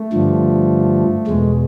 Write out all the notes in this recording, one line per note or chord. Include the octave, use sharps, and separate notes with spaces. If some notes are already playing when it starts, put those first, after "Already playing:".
Already playing: A3
G2 D3 F3
E2 B2 G#3